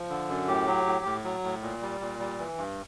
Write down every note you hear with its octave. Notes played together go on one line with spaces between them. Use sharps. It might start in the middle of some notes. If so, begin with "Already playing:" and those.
Already playing: F3
D3
F#2
A2 G4
F#3
A2
A2
F#3
A2
A#2
G3
A#2
G3
E3
G2